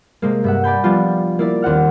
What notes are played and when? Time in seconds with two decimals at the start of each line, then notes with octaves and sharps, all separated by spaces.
0.22 C3 G#3 A#3
0.44 G2 E5 F#5
0.64 D5 G#5 B5 G6
0.84 F3 G3 B3 D4 F4
1.39 A#3 E4 D5
1.62 D#2 C4 F#5 F6